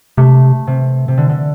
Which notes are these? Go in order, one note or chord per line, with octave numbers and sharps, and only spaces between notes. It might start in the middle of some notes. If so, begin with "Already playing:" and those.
C3 A3
C3
C3
D3
D3